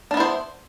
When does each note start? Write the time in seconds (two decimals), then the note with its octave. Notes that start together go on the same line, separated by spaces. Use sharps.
0.11 D4
0.14 B3
0.17 E4
0.20 C5